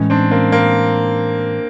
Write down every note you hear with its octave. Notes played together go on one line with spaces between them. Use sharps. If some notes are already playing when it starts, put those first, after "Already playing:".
Already playing: A2 E3 G#3 C#4
C4 D4
A#3 C4
A#3 C4